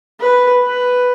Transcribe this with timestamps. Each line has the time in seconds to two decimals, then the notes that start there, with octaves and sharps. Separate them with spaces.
0.21 B4
0.63 B4